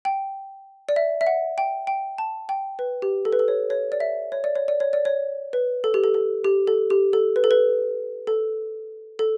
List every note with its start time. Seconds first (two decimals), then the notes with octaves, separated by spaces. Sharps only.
0.05 G5
0.89 D5
0.96 E5
1.21 E5
1.27 F#5
1.58 G5
1.87 G5
2.18 A5
2.49 G5
2.79 B4
3.02 G4
3.25 A4
3.33 B4
3.39 A4
3.48 C#5
3.70 C#5
3.92 D5
4.00 E5
4.32 C#5
4.44 D5
4.56 C#5
4.68 D5
4.80 C#5
4.93 D5
5.05 C#5
5.53 B4
5.84 A4
5.94 G4
6.04 A4
6.14 A4
6.44 G4
6.67 A4
6.90 G4
7.13 A4
7.36 B4
7.44 A4
7.51 B4
8.27 A4
9.19 A4